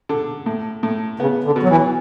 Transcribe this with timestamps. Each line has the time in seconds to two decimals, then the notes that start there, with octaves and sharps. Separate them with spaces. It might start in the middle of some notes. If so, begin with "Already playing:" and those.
0.09 D3
0.46 A2
0.83 A2
1.19 C#3 B3
1.44 D3
1.56 B2
1.63 F#3
1.69 E3